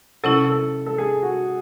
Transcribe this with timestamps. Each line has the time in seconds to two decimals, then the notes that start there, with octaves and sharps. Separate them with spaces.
0.24 C3 F#3 C#4 E4 A4
0.49 A4
0.86 A4
0.98 G#4
1.23 F#4